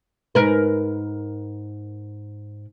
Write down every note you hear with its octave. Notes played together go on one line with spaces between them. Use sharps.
G#2 A#4 B4